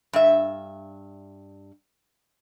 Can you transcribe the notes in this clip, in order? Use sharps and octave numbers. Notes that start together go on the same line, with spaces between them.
G2 E5